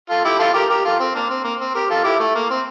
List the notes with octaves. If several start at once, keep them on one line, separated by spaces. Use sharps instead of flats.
F4 A4
E4 G4
F4 A4
G4 A#4
G4 A#4
F4 A4
C4
A#3 D4
C4
A#3
C4
G4 A#4
F4 A4
E4 G4
A3
A#3
C4